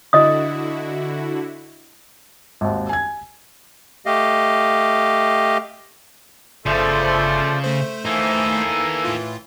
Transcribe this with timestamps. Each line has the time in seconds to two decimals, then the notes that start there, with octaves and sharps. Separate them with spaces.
0.13 D3 E4 F#4 D#5 D#6
2.61 G#1 D#2
2.89 G#5 G#6
4.06 A3 G4 D#5 F5
6.66 G1 C#3 F3 A3 C5 D5
7.64 A3 C5
8.05 E3 A#3 D#4 A4 G#5
9.05 A2 F4